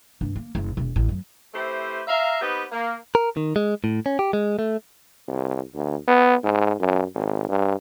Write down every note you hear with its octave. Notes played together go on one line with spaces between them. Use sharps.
G2
A#3
F#1
E1
A1
F#2
A3 C4 E4 G4 B4 C5
E5 F5 A#5
B3 C4 D#4 G4 B4
A#3
A#4
D#3
G#3
A2
C#4
G4
G#3
A3
C2
D2
B3
G#2
F#2
G#1
G2